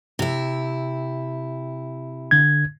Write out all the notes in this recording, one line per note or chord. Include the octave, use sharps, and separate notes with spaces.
C3 E4
D3 G#6